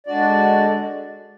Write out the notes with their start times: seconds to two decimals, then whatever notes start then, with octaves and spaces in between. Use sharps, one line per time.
0.07 D3 G#3 D4 F#4 D5